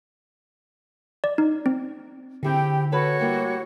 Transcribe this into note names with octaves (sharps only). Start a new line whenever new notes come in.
D5
D#4
C4
D3 C4 E4 G4 G#4 G5
F#4 A4 B4 C#5
G3 A#3 E4